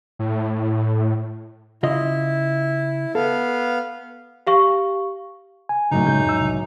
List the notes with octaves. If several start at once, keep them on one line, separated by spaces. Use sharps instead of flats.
A2
C#3 E4 F4 D#5
B3 A4 F5
G4 F5 C#6
G#5
C#2 F#2 A2 C#3 F#3 A3 D#4
C#3 G#3 G6
F2 E6
C2